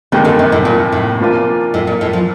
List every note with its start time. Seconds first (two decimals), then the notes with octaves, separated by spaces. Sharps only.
0.12 F1 D#2 D3 D#3 G3
0.25 D3
0.39 C3
0.52 A2
0.65 A#2
0.92 A2
1.20 A#2 F3 A#3 D4 F4
1.74 A2
1.87 A#2
2.01 A2
2.13 F3